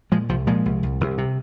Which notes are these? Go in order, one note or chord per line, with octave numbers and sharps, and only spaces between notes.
A#2 F3 G#3
C2 F3
A#2 F3 G#3
C2
C2
C2
C3